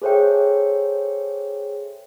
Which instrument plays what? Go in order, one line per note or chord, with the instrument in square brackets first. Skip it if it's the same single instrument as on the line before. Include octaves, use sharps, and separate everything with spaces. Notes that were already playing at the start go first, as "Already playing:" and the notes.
[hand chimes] G#4 A4 C5 C#5 E5 G5